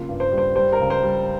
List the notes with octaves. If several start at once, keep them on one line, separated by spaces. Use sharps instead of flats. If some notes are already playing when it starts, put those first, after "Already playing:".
Already playing: C#3 A#3 F4
G2
C5
G3
C5
G3 C5
A#4
C#2
C5
G3